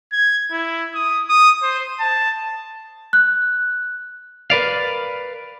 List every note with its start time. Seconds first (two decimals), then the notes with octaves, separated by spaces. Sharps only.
0.12 G#6
0.52 E4
0.95 D#6
1.29 D#6
1.63 C5
2.00 A5
3.13 F#6
4.50 A#4 B4 D5 F5